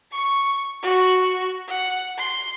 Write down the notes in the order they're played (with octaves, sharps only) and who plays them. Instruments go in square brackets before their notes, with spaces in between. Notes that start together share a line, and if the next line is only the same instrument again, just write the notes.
[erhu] C#6
F#4
F#5
C6